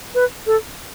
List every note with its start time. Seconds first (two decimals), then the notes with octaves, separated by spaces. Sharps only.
0.15 B4
0.47 A4